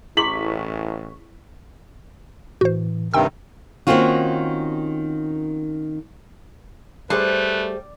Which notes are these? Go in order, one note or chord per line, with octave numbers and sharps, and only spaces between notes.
A1 E4 G#4 C6 C#6 B6 F#7
A2 E3 F#4 C5
G2 C3 D#3 G5 E6
D#3 A#3 C4 C#4 F4 F#4
G3 A3 G#4 B4 C5